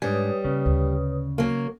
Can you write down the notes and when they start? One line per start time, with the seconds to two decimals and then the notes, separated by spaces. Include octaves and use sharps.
0.02 G#2 G3 D4 B4 C#5 G#5 D#6
0.44 C#3 A#3
0.66 D2
1.38 F#3 A#3